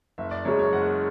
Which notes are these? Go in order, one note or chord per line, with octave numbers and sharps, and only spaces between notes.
F#1 E5
D5
F#2 C#3 G#3 C#5
C#5
F#1 F#5